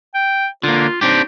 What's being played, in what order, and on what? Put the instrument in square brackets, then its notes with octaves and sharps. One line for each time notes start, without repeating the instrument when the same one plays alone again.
[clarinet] G5
[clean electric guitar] D3 A#3 [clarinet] F4
[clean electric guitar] C4 D4 G4 [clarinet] D#4